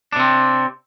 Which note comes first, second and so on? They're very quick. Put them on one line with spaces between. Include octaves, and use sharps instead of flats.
D4 C3 C4